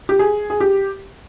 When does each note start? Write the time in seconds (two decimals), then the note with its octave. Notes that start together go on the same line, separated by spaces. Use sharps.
0.09 G4
0.19 G#4
0.50 G#4
0.60 G4